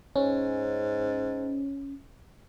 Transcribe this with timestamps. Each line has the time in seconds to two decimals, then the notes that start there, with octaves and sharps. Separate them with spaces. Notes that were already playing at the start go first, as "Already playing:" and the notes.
0.16 G#2 C#4